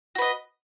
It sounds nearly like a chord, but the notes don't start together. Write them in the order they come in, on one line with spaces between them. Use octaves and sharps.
F#4 B4 D#5